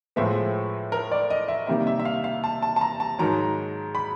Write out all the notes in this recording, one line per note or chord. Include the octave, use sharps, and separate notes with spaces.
A2 F3 G#3 B3 E5
A#4
D5
D#5
E5
C3 D#3 G3 A#3 E5
E5
E5
F5
F5
A5
A5
A5
A#5
A5
G#2 D#3 F#3 A#5
B5